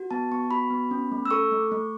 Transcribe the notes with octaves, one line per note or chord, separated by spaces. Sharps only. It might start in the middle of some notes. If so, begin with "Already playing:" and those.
Already playing: F#4
B3 A5
B3 C#6
F#4 B5
B3
C#4
A3
E6
A4 C#6
A3
A3